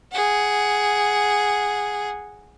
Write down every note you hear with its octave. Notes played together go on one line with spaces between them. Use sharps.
G#4 F#5